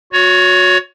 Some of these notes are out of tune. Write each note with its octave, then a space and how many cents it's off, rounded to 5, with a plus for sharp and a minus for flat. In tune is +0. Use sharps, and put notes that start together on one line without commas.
F#4 -25 C#5 +20